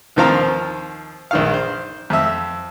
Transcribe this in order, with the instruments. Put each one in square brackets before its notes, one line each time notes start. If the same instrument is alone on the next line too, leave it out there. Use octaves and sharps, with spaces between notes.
[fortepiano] D#2 D#3 F3 C4 F5 A#5
A#1 D#3 F5
C5
F2 E5